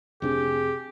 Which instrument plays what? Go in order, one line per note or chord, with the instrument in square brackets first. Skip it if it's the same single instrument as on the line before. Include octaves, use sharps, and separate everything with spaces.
[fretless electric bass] F1 C3 D4 [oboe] G4 [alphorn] G#4